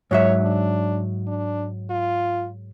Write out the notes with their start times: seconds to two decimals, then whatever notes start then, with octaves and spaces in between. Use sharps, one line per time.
0.11 G#2 F#3 C#5 E5
0.43 D4
1.27 D4
1.90 F4